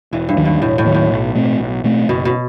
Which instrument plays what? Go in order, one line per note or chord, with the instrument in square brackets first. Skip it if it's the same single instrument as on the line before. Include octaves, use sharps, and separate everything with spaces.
[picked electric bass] E1 [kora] E3
[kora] G2
[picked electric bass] D#2 D#3 F#3
[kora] G2
[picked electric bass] E1 [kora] A2
[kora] A2
[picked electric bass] D#2 D#3 F#3
[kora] A2
[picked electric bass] B1
B2 A3 C4
B1
B2 A3 C4
[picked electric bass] F#1 [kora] B2
[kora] B2